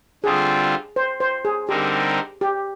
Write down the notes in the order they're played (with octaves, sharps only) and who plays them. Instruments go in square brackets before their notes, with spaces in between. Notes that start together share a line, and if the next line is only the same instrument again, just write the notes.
[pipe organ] D3 G3 C4 F4 [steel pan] G#4
[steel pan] C5
C5
G#4
[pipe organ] D3 G3 C4 D#4 A#4 [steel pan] G4
[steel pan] G4